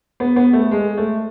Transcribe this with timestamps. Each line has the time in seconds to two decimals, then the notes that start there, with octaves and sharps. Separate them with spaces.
0.20 B3
0.36 B3
0.53 A3
0.71 G#3
0.97 A3